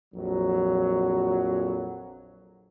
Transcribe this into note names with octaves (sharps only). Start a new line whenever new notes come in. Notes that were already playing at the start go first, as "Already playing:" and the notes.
A#1 F2 F#3